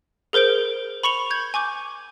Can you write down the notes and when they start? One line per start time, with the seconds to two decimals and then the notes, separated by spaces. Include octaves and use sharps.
0.33 G#4 A#4 C5 G6 D7
1.03 B5 C#6 C#7 F7 G7
1.31 G6 G#6
1.54 G#5 C#6 D6 G6